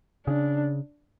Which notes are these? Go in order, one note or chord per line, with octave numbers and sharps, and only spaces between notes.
C#3 D4